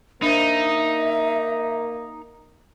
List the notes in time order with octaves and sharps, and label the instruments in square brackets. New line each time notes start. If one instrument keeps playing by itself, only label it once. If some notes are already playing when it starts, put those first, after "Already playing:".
[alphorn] A#3 [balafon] D4 C5 [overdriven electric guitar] D#4 [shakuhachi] E5